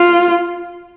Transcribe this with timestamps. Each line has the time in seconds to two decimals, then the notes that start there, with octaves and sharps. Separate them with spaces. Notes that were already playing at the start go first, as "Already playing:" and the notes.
Already playing: F4